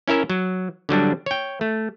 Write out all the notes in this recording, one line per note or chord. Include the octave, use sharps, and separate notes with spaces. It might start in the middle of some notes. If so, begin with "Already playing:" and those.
C#4 E4 A#4 E5
F#3
D3 F#3 G3 D4
C#5 G5
A3